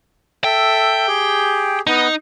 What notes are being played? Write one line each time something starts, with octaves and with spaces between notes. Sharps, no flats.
A4 E5 G5
G4 G#4
B3 D#4